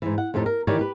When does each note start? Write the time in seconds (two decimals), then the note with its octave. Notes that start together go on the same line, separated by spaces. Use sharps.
0.02 G#2 E3
0.18 F#5
0.34 F2 A2 D#4 G4 A4
0.46 A#4
0.67 D#3 E3 D#4 G4 C#5 D5
0.79 G4 B4